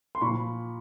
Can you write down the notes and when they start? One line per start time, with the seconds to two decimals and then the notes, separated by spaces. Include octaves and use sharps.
0.15 C6
0.21 A#2 F3 B5 C#6